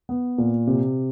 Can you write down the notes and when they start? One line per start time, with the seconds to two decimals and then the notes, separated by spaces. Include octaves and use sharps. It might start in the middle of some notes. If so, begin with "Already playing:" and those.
0.09 B3
0.38 A#2
0.67 C3